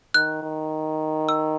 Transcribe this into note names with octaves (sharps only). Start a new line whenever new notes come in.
D#3 F#6
D#3
E6